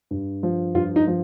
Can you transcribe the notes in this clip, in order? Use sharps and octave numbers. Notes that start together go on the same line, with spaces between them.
G2
F3
G2 F4
D#4
F3